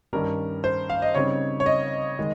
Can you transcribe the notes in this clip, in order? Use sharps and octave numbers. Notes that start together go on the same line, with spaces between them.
G2 D#3 G3 C#4 A#4
C5
F5
D#5
C#3 G3 C4 D#4 C#5
C#5
D#5
D#3 G#3